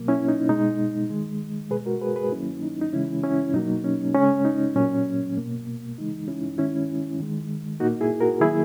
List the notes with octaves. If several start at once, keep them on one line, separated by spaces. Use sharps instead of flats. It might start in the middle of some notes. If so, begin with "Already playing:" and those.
Already playing: B2 F#3 A#3
C#4 E4
D#4
B2 G#3 D#4
D#3 G#3
B2 G#3 G#4 B4
F#4 A#4
G#4 B4
G#4 B4
D#3 F#3 A#3 C#4 E4
D#4
D#4
C#3 E3 G#3 C#4 E4
C#4 E4
B2 F#3 A#3 D#4
C#4
C#3 G#3 C#4
D#4
A#2 F#3 A#3 C#4
B2 A#3
C#3 E3 G#3 D#4
C#4 E4
D#3 G#3 C#4 E4
D#3 G#3
A#2 A#3 D#4 F#4
E4 G#4
F#4 A#4
D#3 F#3 A#3 E4 G#4